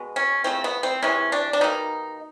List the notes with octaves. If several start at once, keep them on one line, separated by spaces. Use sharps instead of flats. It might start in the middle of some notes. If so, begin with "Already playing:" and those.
Already playing: B2 G#3 B3
C#4
C#3 F3 A3 C4
B3
C4
C3 E3 G#3 C#4
D4
D4
B2 G3 A#3 D#4